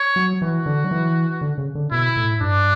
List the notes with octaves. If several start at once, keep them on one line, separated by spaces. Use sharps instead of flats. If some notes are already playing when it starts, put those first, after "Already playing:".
Already playing: C#5
F#3
E3 F#4
D3
F#3
E3
D3
C#3
D3
B2 E4
A2
G2 D4